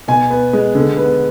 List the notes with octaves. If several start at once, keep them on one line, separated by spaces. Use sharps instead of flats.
B2 G#5
B3
G#3
D3
B3